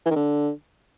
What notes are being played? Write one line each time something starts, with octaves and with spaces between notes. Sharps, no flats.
E3
D#3
D3